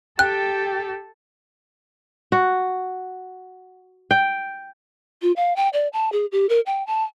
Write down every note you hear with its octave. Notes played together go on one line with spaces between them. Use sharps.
G4 A4 G5 F#6
F#4
G5
F4
F5
G5
D5
A5
G#4
G4
A#4
G5
A5